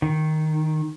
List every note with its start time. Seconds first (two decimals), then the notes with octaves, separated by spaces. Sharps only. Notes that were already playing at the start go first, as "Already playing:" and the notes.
0.02 D#3